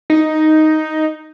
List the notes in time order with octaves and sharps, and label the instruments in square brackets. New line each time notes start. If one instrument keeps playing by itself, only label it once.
[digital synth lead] D#4